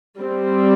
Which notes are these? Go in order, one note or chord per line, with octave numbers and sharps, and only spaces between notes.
G3 C4